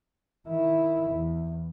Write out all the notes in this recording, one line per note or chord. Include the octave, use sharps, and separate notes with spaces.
D#3 E4
E2